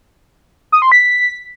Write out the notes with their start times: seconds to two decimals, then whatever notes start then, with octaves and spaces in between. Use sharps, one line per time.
0.72 D#6
0.82 C6
0.92 B6